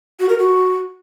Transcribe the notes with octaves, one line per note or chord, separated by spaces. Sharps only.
F#4
A#4
F#4